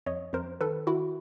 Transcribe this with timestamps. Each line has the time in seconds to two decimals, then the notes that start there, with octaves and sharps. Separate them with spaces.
0.06 F2 C#5 D#5
0.33 F2 A#4 C5
0.61 D#3 A4 B4
0.87 D#3 E4 F#4